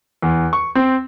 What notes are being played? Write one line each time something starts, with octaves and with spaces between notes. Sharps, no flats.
E2
C#6
C4